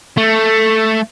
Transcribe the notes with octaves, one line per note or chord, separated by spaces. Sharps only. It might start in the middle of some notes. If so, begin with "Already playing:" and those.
A3